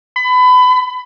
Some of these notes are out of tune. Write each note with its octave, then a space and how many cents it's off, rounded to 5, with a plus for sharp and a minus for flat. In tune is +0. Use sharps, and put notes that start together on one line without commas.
B5 +25